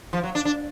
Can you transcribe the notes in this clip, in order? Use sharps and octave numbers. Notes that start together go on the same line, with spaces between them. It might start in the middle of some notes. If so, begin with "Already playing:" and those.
F3
F#3
D4
D4